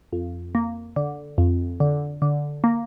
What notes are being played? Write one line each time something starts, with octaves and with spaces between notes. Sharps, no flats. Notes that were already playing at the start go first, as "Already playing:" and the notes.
F2
A#3
D3
F2
D3
D3
A#3